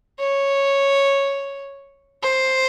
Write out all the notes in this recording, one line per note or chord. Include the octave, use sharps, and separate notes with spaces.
C#5
C5